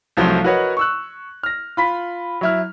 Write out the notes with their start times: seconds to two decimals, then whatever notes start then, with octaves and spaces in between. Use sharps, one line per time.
0.17 C2 F3 F#3 A3 C4 G7
0.44 F#4 A#4 B4 C#5 D#5 F#5
0.77 C#6 E6 F#6
1.43 F6 A#6
1.77 F4 B5 B6
2.41 F#3 E4 F6